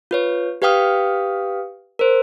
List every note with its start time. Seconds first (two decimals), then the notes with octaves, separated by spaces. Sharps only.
0.11 F4 B4 C#5
0.62 G4 B4 F5 G5 D#6 F6
1.99 A#4 C5